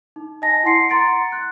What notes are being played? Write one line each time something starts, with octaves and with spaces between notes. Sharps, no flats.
D#4
D#5 G#5 A5 A#6
E4 F#5 C6 C7 C#7
F#5 A#5 C6 A6 C#7 D7
F#6